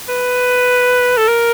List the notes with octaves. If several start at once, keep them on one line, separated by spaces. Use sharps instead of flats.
B4
A4
A#4